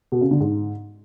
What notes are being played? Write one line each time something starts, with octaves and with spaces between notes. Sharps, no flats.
B2
C#3
D3
G#2